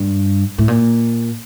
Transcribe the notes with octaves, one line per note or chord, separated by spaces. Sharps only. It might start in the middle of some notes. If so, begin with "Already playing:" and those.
Already playing: G2
A2
A#2